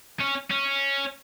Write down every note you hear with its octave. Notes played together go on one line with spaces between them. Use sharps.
C#4
C#4